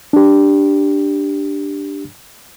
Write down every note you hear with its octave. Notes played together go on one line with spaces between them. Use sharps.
D4 G4